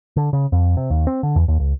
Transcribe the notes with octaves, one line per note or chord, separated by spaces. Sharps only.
D3
C#3
F2
C3
D#2
C4
D3
E2
D#2
C#2